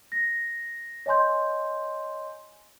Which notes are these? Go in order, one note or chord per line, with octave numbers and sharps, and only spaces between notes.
A#6
C#5 D#5 G#5 C6 G6